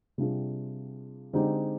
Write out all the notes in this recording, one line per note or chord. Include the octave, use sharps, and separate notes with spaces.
C3 G3 D4 F4 G#4
D3 G#3 C4 D#4 G4